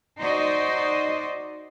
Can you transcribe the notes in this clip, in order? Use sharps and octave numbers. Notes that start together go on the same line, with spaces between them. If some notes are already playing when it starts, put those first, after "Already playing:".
D#4 F#4 C5 D5 D#5